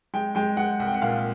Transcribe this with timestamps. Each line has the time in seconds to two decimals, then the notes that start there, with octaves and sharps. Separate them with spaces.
0.14 G#3 G5
0.35 G#3 G5
0.57 G#3 F#5
0.79 C2 F#5
0.87 G5
0.94 F#5
1.02 A#2 F5